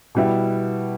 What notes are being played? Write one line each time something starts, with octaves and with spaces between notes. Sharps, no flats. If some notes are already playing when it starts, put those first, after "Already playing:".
B2 G3 B3 E4